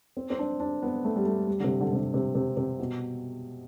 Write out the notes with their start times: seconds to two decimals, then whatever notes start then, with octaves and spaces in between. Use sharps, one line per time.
0.17 C4
0.30 C4
0.39 D4
0.60 D4
0.82 B3
1.05 A3
1.16 G3
1.25 A3
1.47 G3
1.60 D3
1.64 C3
1.81 D3
1.93 C3
1.97 D3
2.14 C3
2.35 C3
2.57 C3
2.80 B2